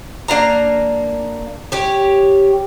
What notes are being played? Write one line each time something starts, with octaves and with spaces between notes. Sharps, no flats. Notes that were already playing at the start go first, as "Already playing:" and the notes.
A#3 D4 F5 A#5
G4 C#5